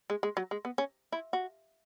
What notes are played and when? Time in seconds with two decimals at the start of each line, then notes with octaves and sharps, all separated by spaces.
0.10 G#3
0.23 G#3
0.37 F#3
0.51 G#3
0.65 B3
0.78 C#4
1.12 E4
1.33 F#4